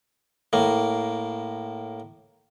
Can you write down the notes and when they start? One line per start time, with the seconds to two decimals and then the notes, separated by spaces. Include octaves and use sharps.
0.53 A2 A#3